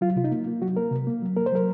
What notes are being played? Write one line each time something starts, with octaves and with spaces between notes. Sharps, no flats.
F#3 F4
C3 F4
D#4
A#3
A#3
F#3 F#4
A#3 A#4
C3
A#3
F#3
A#3 A#4
C5
F#3 A#4